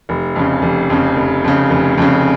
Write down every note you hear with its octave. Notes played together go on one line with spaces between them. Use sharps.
F1
F2 C#3
F1
F2 C#3
F1
F2 C#3
F1
F2 C#3